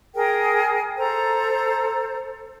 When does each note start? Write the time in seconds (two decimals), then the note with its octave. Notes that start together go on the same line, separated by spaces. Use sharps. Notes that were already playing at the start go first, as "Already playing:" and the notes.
0.15 G#4 A#4 G5
0.97 A4 C5 A#5